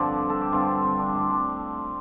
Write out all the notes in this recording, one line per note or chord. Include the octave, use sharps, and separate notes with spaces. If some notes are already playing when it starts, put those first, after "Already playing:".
Already playing: G2 D3 F3 C4 D4 F4
A4
G4
G2 D3 F3 C4 F4
C4
D4
D4
A2 F3 C4 F4
D4 G4